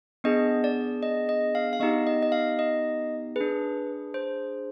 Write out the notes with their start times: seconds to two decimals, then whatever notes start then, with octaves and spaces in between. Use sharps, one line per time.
0.24 B3 D4 G#4 D#5
0.64 D5
1.03 D#5
1.29 D#5
1.55 F5
1.73 F5
1.80 B3 D#4 G4 D#5
2.07 D#5
2.23 D#5
2.32 F5
2.59 D#5
3.36 D4 G#4 B4
4.14 C5